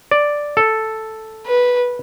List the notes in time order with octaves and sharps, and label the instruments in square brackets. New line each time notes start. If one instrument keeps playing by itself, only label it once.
[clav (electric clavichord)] D5
A4
[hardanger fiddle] B4